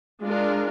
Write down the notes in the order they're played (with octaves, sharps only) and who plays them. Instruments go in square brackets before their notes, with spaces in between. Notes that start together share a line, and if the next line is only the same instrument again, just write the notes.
[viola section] G#3 D4 F4 A#4